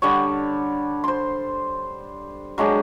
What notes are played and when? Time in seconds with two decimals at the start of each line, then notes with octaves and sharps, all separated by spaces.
0.02 D3 G3 G4 C#5
1.04 C5 C6
2.58 F#3 G#3 D4 G4